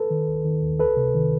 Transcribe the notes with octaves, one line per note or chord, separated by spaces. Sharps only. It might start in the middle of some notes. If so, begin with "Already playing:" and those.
Already playing: A4 B4
D#3
D#2
D#3
D#2
C#2 A4 B4
C3
D#3